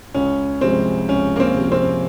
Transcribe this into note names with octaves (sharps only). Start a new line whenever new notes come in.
C#2 C#4
C3 F3 G#3 C4
C#2 C#4
A#3
C4
C3 F3 G#3
C4